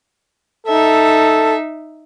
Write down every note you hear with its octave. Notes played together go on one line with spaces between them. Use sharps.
D#4 A4 E5